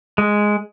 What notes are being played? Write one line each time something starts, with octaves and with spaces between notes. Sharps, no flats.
G#3